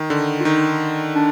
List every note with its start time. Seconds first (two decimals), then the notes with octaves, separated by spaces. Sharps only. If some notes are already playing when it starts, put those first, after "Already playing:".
Already playing: D#3
0.10 D3
0.40 F4
0.45 D#3 D#4
1.16 D4